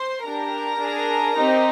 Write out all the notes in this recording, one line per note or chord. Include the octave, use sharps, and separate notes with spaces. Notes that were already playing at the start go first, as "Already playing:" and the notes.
Already playing: C5 C6
D4 G4 A#4 A#5
D4 G#4
C4 D#4 G4